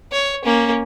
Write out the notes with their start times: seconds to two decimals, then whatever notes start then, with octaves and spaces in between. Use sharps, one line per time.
0.12 C#5
0.44 A#3 C#4